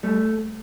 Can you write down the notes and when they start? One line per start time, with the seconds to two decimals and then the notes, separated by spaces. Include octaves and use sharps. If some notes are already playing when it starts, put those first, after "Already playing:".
0.03 G3 A3